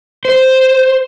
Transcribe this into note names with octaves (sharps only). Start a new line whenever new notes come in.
C5